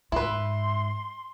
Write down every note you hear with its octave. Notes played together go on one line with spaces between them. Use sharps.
G#2 E4 B4 C6